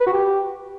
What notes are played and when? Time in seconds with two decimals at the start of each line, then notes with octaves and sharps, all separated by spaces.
0.01 B4
0.07 F#4
0.13 G4